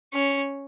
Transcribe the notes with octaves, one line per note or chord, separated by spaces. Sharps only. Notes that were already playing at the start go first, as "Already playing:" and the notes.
C#4